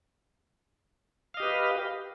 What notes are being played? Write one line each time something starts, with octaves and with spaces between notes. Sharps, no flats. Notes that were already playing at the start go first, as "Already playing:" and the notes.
G4 B4 D#5 F5